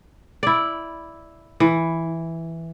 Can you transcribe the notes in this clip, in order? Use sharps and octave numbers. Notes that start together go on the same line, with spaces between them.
E4 D5
E3